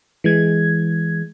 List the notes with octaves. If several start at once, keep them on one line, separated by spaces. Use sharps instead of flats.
E3 G#3 G#6